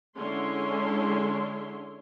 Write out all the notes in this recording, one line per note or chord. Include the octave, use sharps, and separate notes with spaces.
D3 G#3 C#4 E4 C#5 C6